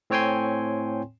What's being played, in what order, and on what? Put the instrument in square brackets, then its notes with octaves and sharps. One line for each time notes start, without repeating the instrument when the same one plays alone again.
[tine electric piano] A2 C4 C#5 G5 G#5 C6